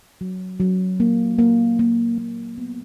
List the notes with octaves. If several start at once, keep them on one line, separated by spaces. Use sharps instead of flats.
F#3
F#3
A#3
A#3
A#3
A#3
B3